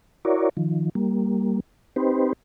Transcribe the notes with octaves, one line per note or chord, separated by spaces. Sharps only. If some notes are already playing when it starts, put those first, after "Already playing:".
E4 F#4 A#4 C#5 D5
D#3 F3
G3 A#3
C4 D#4 G4 B4 C5